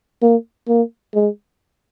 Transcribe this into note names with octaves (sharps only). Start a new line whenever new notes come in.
A#3
A#3
G#3